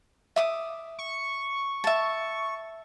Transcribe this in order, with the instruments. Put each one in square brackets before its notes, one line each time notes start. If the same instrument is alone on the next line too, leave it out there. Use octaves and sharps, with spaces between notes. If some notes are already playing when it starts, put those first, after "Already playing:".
[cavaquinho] E5 D6 D#6
[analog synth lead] C#6
[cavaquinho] E5 A5